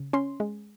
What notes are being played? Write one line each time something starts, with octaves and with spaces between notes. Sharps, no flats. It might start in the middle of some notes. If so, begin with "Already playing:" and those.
Already playing: C#3
C#4 C6
G#3